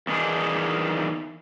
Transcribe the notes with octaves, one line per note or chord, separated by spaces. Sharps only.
E2 D#3 D4 D#4 G#4